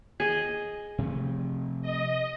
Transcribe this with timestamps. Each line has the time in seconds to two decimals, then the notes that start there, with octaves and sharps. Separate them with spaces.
0.20 G#4 D#5
0.98 C3 F3 A3
1.82 D#5